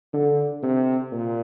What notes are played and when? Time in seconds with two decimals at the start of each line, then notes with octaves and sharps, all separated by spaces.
0.14 D3
0.63 C3
1.12 A#2